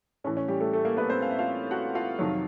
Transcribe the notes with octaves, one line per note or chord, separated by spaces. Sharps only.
A2 E3 C#4
C#4
G3 G4
A3 A4
A3 A4
A#3 A#4
B3 B4
C4 C5
F5
E5
F4 F5
F#4 F#5
F4 F5
F2 C3 D#3 F#3